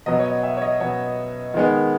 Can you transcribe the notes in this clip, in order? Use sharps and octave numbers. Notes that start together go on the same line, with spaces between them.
B2 F#3 B3 D#5
C#5
D#5
E5
C#5
D#5
B2 F#3 B3 C#5
D#3 G#3 B3